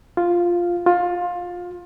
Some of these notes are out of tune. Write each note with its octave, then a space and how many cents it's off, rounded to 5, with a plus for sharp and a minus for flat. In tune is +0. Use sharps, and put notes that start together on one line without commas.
F4 +0
F4 +20